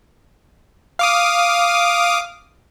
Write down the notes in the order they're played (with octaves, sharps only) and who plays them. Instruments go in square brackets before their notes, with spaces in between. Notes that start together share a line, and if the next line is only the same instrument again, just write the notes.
[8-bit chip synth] F5 D6 D#6